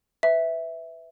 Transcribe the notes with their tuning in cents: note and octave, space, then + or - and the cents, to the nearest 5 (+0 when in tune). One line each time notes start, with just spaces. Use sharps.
B4 +20 E5 -5